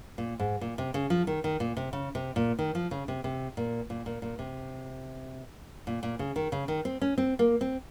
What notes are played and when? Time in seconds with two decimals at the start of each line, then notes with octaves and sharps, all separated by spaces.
0.18 A#2
0.39 G#2
0.61 A#2
0.78 C3
0.94 C#3
1.10 F3
1.27 D#3
1.44 D#3
1.60 A#2
1.77 C3
1.93 C#3
2.15 C3
2.36 A#2
2.59 D#3
2.75 F3
2.91 C#3
3.08 C3
3.24 C3
3.57 A#2
3.90 A#2
4.06 A#2
4.22 A#2
4.39 C3
5.87 A#2
6.03 A#2
6.19 C#3
6.36 D#3
6.52 C#3
6.68 D#3
6.85 C4
7.02 C#4
7.18 C4
7.39 A#3
7.61 C4